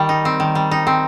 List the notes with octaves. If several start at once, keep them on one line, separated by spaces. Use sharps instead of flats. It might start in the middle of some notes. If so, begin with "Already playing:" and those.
Already playing: D#3 G3
D#4
C4
D#3
G3
D#4
C4